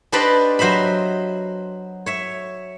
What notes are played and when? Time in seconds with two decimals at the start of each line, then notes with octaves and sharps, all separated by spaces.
0.12 D4 G4 B4 C5 D5 D#5
0.59 F#3 C5 D#5 E5 B5
2.06 C#5 E5